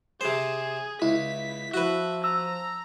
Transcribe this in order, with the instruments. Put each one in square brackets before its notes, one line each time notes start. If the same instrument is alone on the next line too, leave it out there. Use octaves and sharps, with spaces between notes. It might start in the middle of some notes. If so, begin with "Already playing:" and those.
[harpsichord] C3 C5 [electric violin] G#4
[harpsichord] C#2 [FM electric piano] E4 [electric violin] B6
[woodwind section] F3 [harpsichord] F#4 B4 [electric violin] E5
[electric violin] A#5 [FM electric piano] E6